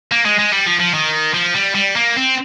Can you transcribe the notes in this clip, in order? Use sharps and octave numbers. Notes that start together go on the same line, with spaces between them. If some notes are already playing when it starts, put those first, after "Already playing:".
A#3
G#3
G#3
G3
F3
F3
D#3
F3
G3
G3
A#3
C4